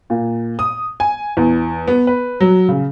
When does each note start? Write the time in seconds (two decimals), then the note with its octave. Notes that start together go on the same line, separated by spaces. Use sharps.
0.10 A#2
0.59 D#6
1.00 G#5
1.37 E2
1.87 B3
2.07 B4
2.40 F#3
2.69 C#3